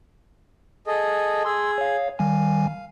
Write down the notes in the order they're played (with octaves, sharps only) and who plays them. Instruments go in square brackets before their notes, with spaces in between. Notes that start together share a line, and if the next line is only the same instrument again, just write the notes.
[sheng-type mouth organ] G#4 A4 D#5
[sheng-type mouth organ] G#4 [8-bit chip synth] C6 E6
[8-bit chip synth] C#5 F5
[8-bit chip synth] D#3 G3 G#5 [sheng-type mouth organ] F5